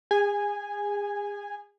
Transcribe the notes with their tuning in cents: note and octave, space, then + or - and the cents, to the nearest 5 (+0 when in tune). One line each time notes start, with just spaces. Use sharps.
G#4 -35 G#5 -5